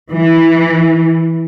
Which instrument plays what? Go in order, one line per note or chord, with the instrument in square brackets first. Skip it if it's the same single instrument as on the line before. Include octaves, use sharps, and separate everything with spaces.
[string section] E3